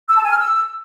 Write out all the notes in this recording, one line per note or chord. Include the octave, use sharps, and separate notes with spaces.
E6
A5
G#5
F6
E6